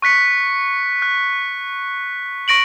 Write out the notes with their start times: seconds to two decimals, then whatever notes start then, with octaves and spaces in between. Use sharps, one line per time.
0.02 C#6 F#6 B6 C#7
1.02 F#6
2.48 C#6 A#6 D7 F#7